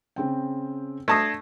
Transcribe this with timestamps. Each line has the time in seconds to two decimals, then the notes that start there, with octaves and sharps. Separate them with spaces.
0.16 C#3 C4 G5
1.08 A3 D4 A5 D#6 G#6 A#6 C7